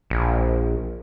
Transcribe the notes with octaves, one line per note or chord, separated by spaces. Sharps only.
A#1